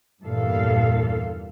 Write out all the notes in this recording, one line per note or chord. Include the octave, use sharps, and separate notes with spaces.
E2 G2 A#2 A4 F5